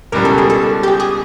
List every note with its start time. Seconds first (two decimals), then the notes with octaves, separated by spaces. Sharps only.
0.12 C#2 B2 G3 A#4
0.25 A4
0.38 G#4
0.50 A4
0.83 G4
0.88 G#4
1.00 G#4